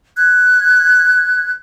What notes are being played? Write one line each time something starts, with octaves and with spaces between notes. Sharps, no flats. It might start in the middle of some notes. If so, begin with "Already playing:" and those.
F#6 G#6